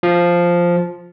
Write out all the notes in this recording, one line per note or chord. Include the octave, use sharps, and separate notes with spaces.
F3